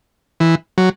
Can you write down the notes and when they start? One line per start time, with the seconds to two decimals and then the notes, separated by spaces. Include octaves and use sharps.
0.40 E3
0.78 F#3